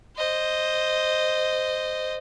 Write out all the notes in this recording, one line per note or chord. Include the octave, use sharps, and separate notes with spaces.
C5 D#5